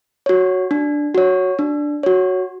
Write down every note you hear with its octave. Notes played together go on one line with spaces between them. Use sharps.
F#4 C#5
D4
F#4 C#5
D4
F#4 C#5